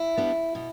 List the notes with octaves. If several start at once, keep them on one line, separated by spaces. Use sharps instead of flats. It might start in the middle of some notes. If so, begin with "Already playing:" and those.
Already playing: E4
G3 B3 D4
B2